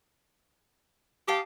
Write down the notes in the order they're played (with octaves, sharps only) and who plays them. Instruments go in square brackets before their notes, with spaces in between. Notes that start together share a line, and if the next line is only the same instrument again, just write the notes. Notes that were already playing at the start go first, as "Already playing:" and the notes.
[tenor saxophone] G4 [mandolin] F5 A5 D#6